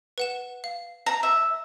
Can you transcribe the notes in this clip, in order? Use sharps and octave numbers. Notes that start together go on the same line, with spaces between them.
B4 F#5 E7
F5
A5 A#5
E5